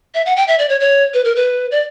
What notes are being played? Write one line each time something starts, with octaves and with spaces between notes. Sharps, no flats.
E5
F#5
G5
E5
D5
C#5
C#5
B4
A#4
B4
D5